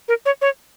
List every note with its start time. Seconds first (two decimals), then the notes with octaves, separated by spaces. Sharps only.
0.08 A#4
0.26 C#5
0.41 C#5